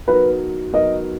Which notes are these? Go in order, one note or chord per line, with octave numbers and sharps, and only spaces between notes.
F#3 B3 D#4 F#4 A#4 B4
F#3 B3 D#4 F#4 A#4 D#5